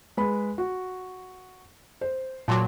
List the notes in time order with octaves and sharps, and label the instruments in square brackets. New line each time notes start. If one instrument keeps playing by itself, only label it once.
[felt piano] G#3 B4 B5
F#4
C5
[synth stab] A#2 F#3 [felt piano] A5 C6 D6